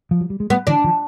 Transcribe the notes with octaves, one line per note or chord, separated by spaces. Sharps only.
F3
F#3
G3
G#3
G3 A3 B3
D3 E3 D4
D#3 F3